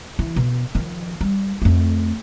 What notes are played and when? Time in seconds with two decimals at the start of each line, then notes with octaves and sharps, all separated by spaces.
0.19 E3
0.36 B2
0.75 D#3 F3
1.21 G3
1.62 F2 A3